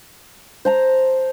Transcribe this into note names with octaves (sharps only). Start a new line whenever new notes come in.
C5 A5 A#5